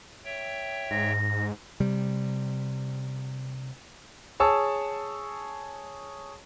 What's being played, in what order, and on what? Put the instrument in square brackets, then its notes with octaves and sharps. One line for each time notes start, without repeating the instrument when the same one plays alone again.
[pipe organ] C#5 E5 G5
[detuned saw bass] G#2 [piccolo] A#6
[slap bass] C3 G3
[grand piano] G#4 C#5 A5 E6